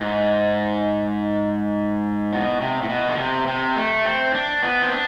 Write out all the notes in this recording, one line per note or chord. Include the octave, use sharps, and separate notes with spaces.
G#2
B2
C3
A2
B2
D3
C3
C3
A3
C4
D4
B3
C4
D4